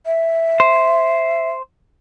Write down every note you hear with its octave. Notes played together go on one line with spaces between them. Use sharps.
E5
C5